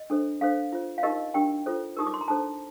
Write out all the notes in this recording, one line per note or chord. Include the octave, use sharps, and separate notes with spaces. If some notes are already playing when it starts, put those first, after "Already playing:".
Already playing: D#5
D4 A4 C5
D4 A4 C5 F5
F4 C5
F5
D#4 G4 A#4 D#5
D4 G4 A#4 G5
F4 A4 C5
D#4 G4 A#4 D#6
D6
C6
A#5
D4 A4 C5 A5